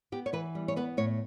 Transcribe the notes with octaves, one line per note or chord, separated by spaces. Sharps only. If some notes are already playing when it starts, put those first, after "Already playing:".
B3 G4
C#5
E3 B4
G3
C#5
B3 B4
A2 C#5